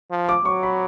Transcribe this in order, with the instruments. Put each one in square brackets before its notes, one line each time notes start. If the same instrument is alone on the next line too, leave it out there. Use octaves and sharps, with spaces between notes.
[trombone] F3
[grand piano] D6
[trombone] F#3 [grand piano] C#6
[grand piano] B5